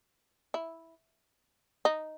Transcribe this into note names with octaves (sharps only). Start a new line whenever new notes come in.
E4
D#4